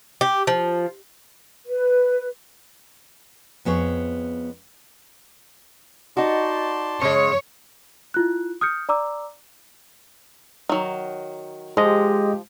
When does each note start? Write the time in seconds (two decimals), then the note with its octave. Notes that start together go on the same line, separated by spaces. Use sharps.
0.21 G4
0.47 F3
1.67 B4
3.65 F2 B3 G#4 C#5
6.17 D#4 F#4 D5 A5 C6
7.01 C#3 G#3 C#5
8.14 E4 F4 F#6
8.61 D#6 F6 G6 C#7
8.89 D5 A#5 D6 E6
10.69 D#3 F#3
11.77 F3 G#3 G4 D#5